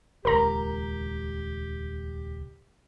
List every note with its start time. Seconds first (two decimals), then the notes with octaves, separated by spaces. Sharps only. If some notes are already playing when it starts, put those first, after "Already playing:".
0.25 D#1 C#2 G4 A#4 A#5